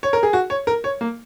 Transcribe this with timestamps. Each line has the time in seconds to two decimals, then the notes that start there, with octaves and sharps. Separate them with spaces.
0.03 C#5
0.13 A#4
0.23 G#4
0.33 F#4
0.50 C#5
0.67 A#4
0.84 C#5
1.01 A#3